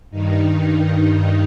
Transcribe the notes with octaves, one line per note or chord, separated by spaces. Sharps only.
G2 D#3 D#4